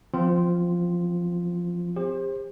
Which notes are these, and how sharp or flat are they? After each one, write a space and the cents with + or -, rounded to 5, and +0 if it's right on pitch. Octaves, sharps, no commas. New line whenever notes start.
F3 +0 C4 -20 F4 +0
G4 +40 C5 +25